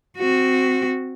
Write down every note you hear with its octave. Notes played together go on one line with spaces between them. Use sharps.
C4 F#4